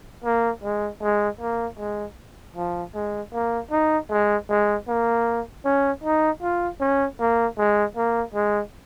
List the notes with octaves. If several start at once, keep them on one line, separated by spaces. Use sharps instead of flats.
A#3
G#3
G#3
A#3
G#3
F3
G#3
A#3
D#4
G#3
G#3
A#3
C#4
D#4
F4
C#4
A#3
G#3
A#3
G#3